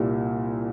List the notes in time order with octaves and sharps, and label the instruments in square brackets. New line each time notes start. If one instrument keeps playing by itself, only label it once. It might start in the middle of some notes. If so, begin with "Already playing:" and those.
Already playing: [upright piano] C2 A#2 G3 A#3